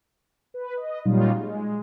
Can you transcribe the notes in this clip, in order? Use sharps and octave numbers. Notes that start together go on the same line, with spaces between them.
B4
D#5
A#2 F#3 G3 C#4 D#4 F4
G#3